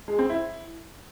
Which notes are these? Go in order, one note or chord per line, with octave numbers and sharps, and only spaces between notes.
G#3
C4
E4